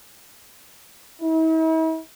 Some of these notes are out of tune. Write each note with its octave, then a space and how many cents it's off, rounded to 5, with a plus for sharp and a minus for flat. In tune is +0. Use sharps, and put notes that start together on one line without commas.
E4 -45